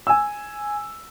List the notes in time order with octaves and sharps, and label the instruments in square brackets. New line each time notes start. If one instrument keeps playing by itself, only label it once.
[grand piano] G#5 E6